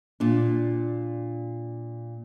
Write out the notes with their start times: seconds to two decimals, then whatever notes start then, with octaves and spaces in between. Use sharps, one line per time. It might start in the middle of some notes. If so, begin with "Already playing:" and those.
0.20 A#2 D4